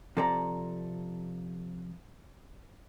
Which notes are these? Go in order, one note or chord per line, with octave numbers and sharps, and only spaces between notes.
C3 F3 A4 D5 A#5